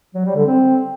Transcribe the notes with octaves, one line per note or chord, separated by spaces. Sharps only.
F#3
G3
D3
C4